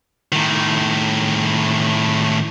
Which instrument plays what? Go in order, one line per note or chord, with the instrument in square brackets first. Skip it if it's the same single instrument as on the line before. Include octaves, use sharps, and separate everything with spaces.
[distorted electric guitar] A2 D#3